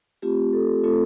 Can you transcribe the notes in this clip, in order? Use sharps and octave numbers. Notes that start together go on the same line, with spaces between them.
A3 C4 F4 G4
A4
A3 C4 F4 A4